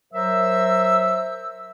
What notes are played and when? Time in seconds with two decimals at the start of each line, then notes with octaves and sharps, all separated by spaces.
0.12 F#3 A#4 C5 E5 E6